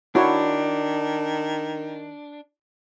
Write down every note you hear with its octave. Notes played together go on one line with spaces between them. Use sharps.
D#3 D4 E4 F#4 C#5